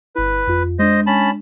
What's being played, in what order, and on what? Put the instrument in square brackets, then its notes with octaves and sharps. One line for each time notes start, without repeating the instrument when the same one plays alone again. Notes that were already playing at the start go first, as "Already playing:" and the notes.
[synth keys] G1 E4 [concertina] B4
[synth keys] F2 F4
[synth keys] G#3 D4 [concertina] C5 D#5
[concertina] C#4 A5 B5